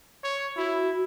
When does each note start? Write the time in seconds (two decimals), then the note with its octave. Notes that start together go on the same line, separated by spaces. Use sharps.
0.23 C#5
0.57 E4 F#4